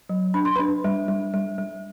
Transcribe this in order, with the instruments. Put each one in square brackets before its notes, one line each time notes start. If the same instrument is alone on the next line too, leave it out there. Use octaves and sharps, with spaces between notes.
[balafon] F#3
D4 B5
C6
D4 B4 B5
G3
G3
G3
G3